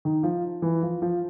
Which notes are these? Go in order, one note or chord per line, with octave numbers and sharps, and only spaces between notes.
D#3
F3
E3
F3
F3